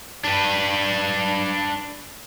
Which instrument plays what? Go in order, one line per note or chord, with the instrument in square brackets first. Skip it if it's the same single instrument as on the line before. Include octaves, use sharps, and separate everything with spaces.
[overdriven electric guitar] D4 B4